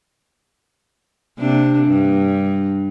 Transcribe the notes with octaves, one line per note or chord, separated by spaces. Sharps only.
C3 A#3 D4
G2